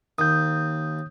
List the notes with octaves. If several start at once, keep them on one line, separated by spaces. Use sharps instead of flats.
D#2 D#6 G6